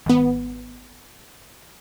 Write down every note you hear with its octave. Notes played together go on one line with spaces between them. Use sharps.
G#1 B3